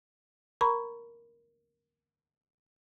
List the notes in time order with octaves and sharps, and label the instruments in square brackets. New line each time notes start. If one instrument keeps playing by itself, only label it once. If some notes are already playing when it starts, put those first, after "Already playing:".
[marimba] A#4 A#5 B5 C#6